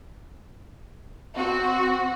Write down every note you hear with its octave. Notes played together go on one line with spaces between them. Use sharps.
C4 F#4